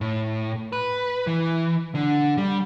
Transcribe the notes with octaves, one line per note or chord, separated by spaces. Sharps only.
A2
B4
E3
D3
G3